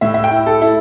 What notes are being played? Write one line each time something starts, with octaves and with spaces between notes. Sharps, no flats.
A2 E5
E5
G5
E4
A4
E4